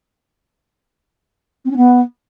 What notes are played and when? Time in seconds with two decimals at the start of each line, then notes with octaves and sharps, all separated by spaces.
1.65 C4
1.70 C#4
1.76 B3